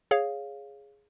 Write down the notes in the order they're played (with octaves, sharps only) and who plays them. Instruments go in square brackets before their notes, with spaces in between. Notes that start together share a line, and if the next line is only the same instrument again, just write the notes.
[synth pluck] G#4 C#5 F5